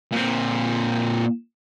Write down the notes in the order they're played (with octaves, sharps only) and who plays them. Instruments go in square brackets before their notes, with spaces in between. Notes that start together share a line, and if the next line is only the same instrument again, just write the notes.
[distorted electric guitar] A#2 C4